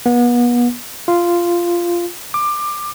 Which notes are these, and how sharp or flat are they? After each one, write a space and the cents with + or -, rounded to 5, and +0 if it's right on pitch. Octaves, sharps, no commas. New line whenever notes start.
B3 -35
F4 -10
D6 +20